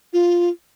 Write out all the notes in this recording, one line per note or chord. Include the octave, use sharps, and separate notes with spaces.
F4